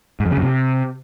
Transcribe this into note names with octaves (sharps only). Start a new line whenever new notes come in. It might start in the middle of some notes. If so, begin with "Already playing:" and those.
G#2
F2
C#3
F#2
C3